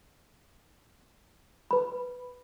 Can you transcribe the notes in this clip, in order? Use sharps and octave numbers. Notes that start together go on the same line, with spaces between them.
B4 B5